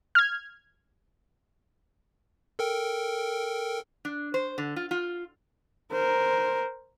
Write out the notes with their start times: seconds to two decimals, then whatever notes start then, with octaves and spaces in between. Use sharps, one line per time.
0.15 F6 G#6
2.59 A4 A#4 G5
4.05 D4
4.34 C5
4.58 D3
4.76 F4
4.91 F4
5.92 A#4 C5